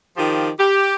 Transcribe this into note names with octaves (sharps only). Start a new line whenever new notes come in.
D#3 F3 F4 G4
G4